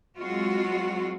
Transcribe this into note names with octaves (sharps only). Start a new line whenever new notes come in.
F#3 G#3 C4 F4 F#4